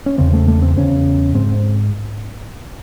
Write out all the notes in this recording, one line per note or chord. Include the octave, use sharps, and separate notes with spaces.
C#4
E2 C#3 C4
A3
A3
C4
E2 C#3 C#4
G#2 C4